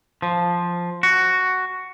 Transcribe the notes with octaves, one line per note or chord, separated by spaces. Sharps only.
F3
F#4